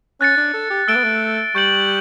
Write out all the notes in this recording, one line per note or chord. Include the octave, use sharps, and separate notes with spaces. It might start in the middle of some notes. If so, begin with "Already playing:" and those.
C#4 F#6 A6 C#7
D4
A4
G4
A3 E6 A6 D7 G7
B3
A3
G3 C#6 G6 C#7 F#7